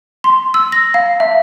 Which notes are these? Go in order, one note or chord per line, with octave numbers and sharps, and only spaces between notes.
C6
E6
A#6
F5
E5